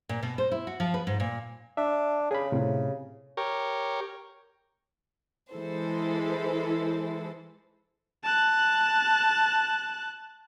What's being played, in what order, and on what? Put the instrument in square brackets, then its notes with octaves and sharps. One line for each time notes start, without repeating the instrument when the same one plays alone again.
[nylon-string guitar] A#2
B2
C5
E4
F#4
F3
B4
G#2
A#2
[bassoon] D4 [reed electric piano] E5
[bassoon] C#3 [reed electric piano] G#4 B5
[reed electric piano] A2 C3
[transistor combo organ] G4 A#4 C#5
[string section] E3 G#3 E4 A4 C5
[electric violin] A5 F#6